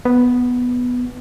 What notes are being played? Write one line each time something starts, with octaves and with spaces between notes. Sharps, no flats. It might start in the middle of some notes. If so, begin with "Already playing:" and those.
B3